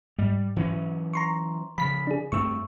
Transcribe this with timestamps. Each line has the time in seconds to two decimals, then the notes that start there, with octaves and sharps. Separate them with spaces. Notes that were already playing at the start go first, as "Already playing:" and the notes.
0.19 G#2 G3
0.56 E3 F#3 C#4
1.13 A#5 C6 C#6
1.78 C#3 F3 B5 B6
2.07 D4 G#4
2.32 G2 A3 C4 C#6 E6